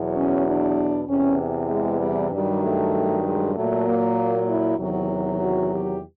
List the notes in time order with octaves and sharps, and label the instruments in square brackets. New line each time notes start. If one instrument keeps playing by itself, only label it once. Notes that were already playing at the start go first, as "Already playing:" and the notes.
Already playing: [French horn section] E2 B2 F#3
C#4
D4
E2 C3 E3 C#4
G#3
G3
G2 D#3 F#3 G3
A3
G#3
A#2 F#3 A3
A#3
E4
E2 C3 D#3 F#3
F#4
G4